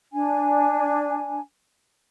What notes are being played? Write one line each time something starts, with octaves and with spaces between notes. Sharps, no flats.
D4 G#5